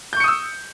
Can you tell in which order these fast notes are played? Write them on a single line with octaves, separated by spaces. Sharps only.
G6 C#6 C#7 D#6 E6